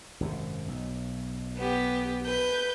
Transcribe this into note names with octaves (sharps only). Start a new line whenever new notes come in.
G#1 F#2 C3
B1
B3 G4
B4 G6